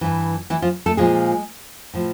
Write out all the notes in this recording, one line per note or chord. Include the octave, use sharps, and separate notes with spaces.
G2 E3
E3 E4
F3 F4
A3 A4
A#2 F3 G#3 G#4
A2 F3